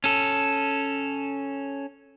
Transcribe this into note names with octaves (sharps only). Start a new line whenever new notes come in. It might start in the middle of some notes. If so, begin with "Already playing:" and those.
C#4 A4